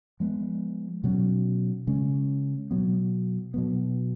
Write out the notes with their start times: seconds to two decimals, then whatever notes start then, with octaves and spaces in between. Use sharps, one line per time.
0.20 F3 G#3 B3
1.04 B2 F#3 C#4
1.87 C#3 G#3 C#4
2.71 B2 F#3 B3
3.54 B2 F#3 B3